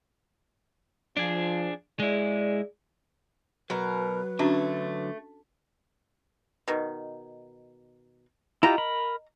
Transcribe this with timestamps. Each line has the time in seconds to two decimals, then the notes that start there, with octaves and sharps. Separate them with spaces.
1.17 F3 D4 G#4
2.00 G#3 E4 G#4 D5
3.70 B2 F#3 A#4 B4
4.39 D3 F#3 A3 C#4 D4 F#4
6.68 B2 D#3
8.63 E4 F4 G4 D#5 A#5
8.78 A#4 B5